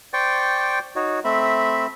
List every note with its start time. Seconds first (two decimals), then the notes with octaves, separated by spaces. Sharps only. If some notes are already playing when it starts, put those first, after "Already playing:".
0.14 C5 D5 G5 C#6
0.96 D#4 F#4 C#5
1.25 A3 C4 E5 B5